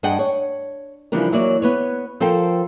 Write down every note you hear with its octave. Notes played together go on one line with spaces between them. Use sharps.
G2 D4 G#4 D#5 F#5 G5
C#5
C#3 E3 F3 G3 D4 A#4
E3 F#3 A#3 C#5 D5
B3 B4 C#5
F3 A4 A#4 C5 F5 G5